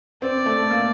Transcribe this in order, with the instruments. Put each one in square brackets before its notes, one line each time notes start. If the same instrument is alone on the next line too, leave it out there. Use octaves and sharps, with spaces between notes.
[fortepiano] C4 [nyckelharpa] D5
[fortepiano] A3
A#3